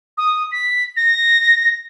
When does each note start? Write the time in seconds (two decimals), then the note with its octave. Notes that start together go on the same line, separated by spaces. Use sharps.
0.18 D#6
0.52 B6
0.96 A#6